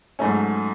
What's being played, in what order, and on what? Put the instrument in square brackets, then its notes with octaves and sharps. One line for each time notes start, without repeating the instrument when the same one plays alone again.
[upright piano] G#2 F#3 A3 C#4